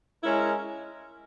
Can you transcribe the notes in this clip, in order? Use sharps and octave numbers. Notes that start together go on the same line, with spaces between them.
G#3 C#4 E4 A#4